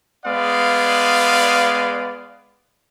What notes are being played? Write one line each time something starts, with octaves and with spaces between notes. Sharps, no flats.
G#3 B3 D5 F5